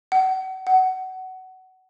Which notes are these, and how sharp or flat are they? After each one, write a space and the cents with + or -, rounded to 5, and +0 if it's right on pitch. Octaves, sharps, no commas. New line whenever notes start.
F#5 +35
F#5 +20